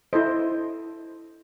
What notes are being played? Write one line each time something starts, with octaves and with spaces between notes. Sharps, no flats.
E4 A4 C5 D#5